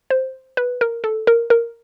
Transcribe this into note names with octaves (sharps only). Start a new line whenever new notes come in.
C5
B4
A#4
A4
A#4
A#4